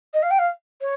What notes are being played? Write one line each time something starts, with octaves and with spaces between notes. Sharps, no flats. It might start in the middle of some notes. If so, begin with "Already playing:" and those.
D#5
F5
G5
F5
C#5